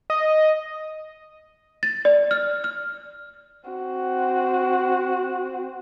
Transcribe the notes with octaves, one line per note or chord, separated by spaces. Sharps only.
D#5
A6
D5
F6
F6
C4 F#4